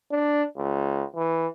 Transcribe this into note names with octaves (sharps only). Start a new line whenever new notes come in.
D4
C#2
E3